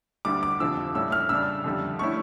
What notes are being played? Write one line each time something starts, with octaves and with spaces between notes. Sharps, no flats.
D2 D3 G3 D6
D6
F2 D3 F3 E6
A2 G3 C#4 E6
F6
C#3 G3 D4 E6
F2 D3 G3
D3 A3 C#4 E4 C#6